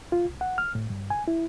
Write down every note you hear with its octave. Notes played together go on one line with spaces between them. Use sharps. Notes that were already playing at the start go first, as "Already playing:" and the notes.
F4
C2
F#5
F6
A2
G2
G#5
E4